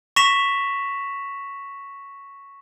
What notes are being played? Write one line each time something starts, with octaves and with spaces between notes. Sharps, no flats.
C#6 A#6 B6 E7 F7